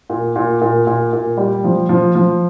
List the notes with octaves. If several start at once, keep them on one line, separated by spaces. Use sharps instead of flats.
A#2
A#2
A#2
A#2
A#2
G3
F3
F3
F3